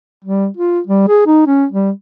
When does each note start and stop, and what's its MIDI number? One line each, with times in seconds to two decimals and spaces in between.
0.25 0.47 55
0.57 0.80 65
0.87 1.04 55
1.08 1.22 68
1.26 1.46 63
1.47 1.66 61
1.72 1.91 55